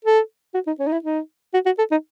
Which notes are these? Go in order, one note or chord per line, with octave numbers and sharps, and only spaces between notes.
A4
F#4
D#4
C#4
D#4
E4
D#4
F#4
F#4
A4
D#4